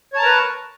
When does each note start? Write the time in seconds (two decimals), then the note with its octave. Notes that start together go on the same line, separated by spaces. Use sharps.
0.13 C#5
0.16 A5
0.19 A#5
0.22 A#4
0.25 B4